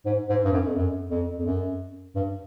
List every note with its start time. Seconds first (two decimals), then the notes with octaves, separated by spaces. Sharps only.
0.06 G#2
0.29 G#2
0.45 G2
0.53 F#2
0.67 F2
0.76 F#2
1.11 F2
1.40 F2
1.46 F#2
2.16 G2